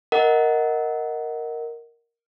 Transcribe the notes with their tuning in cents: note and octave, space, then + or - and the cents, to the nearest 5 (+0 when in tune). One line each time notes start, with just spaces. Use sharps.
A#4 +0 D#5 +15 F#5 +0